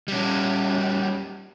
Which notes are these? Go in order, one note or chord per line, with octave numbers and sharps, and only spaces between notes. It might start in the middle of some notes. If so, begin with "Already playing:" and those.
G3 C#4